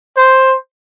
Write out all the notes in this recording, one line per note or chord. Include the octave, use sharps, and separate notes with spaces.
C5